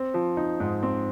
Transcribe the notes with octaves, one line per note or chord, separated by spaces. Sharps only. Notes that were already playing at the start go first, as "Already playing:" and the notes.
Already playing: C4
F3
D#4
G#2
C4